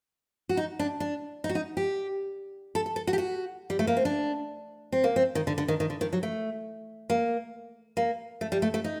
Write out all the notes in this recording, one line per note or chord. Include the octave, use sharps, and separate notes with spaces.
F#4
D#4
D4
D4
D#4
F#4
D#4
G4
A4
A4
A4
F#4
G4
F#4
G3
A3
A#3
C4
D4
C4
A#3
C4
D#3
D3
D3
D#3
D#3
D3
D#3
F#3
A3
A#3
A#3
A3
G3
A3
A3
D#4